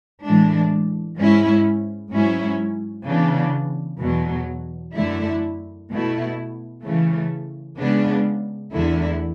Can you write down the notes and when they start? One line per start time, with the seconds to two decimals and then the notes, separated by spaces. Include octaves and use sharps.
0.23 A2 E3 G#3 D4
1.18 G#2 G#3 C#4 E4
2.12 G#2 F#3 C#4 E4
3.06 C#3 E3 B3 D4
4.00 E2 B2 F#3
4.95 F#2 D3 A3 E4
5.89 B2 A3 E4
6.83 C#3 E3 A3
7.77 C#3 G#3 B3 D4
8.72 E2 D3 A3 E4